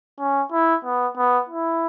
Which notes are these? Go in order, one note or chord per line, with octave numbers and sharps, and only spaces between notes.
C#4
E4
B3
B3
E4